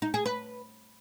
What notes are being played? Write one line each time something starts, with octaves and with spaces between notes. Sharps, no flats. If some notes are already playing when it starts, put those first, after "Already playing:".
D#4
G#4
B4